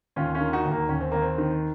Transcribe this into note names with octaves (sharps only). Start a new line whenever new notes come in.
D#2 C#4 F4
C#4 F4
D#3
D#4 F#4
D#2
A#3
D#2 C#4
C4
D#2 A#3
C4
D#3